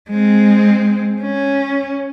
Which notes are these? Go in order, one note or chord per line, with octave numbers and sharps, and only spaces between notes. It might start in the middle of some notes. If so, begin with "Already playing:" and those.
G#3 C4
C#4